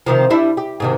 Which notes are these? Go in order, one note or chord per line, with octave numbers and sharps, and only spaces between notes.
C3 D#3 F3
G3 D4 E4
G4
G#2 C3 D#3